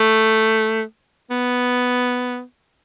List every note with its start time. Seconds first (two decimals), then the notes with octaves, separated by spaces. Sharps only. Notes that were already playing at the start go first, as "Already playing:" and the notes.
Already playing: A3
1.31 B3